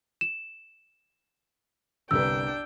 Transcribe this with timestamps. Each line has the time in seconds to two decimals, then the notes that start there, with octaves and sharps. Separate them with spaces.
0.21 E7
2.11 G1 C2 D4 B4 G5 E6